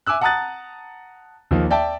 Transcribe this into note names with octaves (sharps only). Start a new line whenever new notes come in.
E5 G#5 D6 E6 F#6
F#5 A5 A#5 D#6 F#6 A6
D#2 F3 A#3 D#4
D5 E5 G5 A5